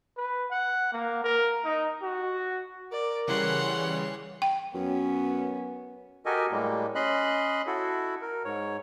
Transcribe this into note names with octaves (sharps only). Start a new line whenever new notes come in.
B4
F#5
A#3
A#4
D#4
F#4
A#4 D5
C#3 E3 G3 C#5 F#5 C6
G5
F#2 B3 C#4
F#4 G4 A4 A#4 D#5 G#5
A2 G3 G#3 A#3
C#4 D#5 B5 C6 F#6
E4 F#4 A4
A#4
G#2 C#5